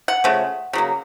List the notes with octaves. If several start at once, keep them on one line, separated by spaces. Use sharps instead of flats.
F#5
C#3 F3 A3
C#3 F#3 A#3